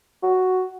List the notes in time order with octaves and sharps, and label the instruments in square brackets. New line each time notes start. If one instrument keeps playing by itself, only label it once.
[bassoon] F#4